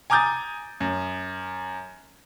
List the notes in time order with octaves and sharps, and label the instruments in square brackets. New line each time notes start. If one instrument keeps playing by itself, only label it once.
[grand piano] G#5 A#5 D6 D#6 G6 A6
F#2